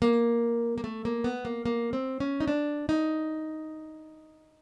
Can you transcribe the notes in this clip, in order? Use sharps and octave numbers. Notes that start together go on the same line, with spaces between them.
A#3
A#3
A3
A#3
B3
A#3
A#3
C4
C#4
D#4
D4
D#4